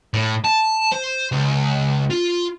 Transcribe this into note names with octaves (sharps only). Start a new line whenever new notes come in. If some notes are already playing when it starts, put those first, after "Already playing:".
A2
A5
C5
C#2
F4